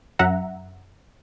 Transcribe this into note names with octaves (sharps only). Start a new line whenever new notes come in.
F#2 E5 F#5 A#5